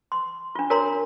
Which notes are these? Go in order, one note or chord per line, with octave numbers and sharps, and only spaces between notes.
C6
D4 F4
F#4 A#4 C#5 A#5 C6